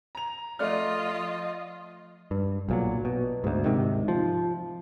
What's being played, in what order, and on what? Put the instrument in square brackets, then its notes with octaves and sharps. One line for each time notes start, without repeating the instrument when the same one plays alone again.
[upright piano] A#5 F7
[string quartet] F3 F4 D#5 [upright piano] A3 D5 F6
[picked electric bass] G2
B1 A#2 F#3
B2
D2 G#2
G#2 C3 D#3
F3